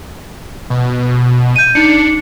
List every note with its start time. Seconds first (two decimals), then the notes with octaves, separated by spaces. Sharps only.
0.70 B2
1.56 G6 D#7
1.75 D4 D#4 C#7